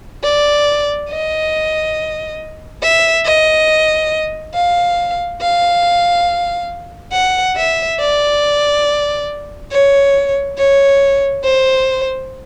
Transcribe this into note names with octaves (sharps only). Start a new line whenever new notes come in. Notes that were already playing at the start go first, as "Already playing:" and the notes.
D5
D#5
E5
D#5
F5
F5
F#5
E5
D5
C#5
C#5
C5